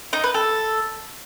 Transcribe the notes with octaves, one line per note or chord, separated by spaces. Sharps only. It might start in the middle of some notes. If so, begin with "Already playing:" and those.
D#4
B4
A4